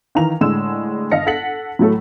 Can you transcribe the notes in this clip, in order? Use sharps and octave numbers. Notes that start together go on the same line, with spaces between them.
D#3 E3 F5 A#5 F7
A2 D3 G#3 E6 E7
G1 D#5 F5 A5 A#6 C#7
A4 F#5 A6 B6 C#7 F#7
A2 F#3 A3 A4